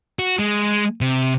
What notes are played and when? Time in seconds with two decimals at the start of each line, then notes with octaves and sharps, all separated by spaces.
0.19 F#4
0.39 G#3
1.01 C3